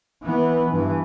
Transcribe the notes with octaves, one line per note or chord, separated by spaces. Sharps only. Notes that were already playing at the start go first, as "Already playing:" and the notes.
E3 B3
G2 E3